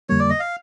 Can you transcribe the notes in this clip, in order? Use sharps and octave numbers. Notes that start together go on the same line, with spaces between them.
F2 D3 G3 A#3 C#5
D5
D#5
F5